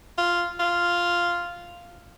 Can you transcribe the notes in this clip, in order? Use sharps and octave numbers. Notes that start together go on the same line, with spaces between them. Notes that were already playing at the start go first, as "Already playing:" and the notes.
F4
F4